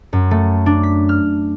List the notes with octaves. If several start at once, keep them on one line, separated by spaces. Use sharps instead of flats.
F#2
A3
D4
B6
F6